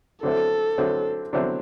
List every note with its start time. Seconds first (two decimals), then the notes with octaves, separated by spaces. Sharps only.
0.23 D3 F#3 C4 E4 A4
0.78 D3 F#3 C4 E4
1.33 D3 F#3 C4 E4